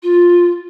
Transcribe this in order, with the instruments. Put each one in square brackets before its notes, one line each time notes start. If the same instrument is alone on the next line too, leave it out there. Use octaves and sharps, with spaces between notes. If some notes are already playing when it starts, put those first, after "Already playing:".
[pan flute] F4